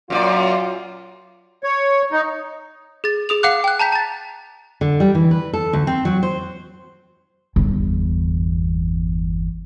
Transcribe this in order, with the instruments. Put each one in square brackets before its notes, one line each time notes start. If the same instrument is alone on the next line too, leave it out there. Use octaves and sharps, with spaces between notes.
[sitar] F#2 A#2 D5 [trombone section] F#3 F4
[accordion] C#5
D#4
[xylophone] G#4 A6
G#4 D#6 F7
F5 F#5 D6 F#6
G5 F#6
A5 A#5 G6 B6
A5 A6
[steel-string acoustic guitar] D3
G3
E3
B4
A4
D2
C4
F#3
C5
[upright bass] G1 E2